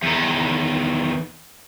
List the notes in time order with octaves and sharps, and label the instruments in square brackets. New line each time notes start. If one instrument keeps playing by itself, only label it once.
[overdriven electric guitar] E2 D#3